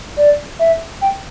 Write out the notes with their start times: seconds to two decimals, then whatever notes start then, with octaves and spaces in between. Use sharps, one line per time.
0.17 D5
0.59 E5
1.01 G5